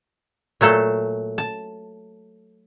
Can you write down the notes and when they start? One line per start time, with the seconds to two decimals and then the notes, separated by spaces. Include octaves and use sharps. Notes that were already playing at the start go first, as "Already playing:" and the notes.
0.61 A#2 F#3 A3 A4
1.38 A5